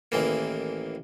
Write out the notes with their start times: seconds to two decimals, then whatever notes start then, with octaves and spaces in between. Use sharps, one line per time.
0.12 A1 D#3 E3 A#3